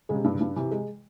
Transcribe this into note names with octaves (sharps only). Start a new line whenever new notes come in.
C#3 G#3
C3
G2
C#3
G2
C3 E3
G#3